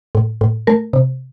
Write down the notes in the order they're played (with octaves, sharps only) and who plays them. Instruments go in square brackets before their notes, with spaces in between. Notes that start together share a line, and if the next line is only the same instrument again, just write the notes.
[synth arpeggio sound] A2
A2
A3 A#4
C3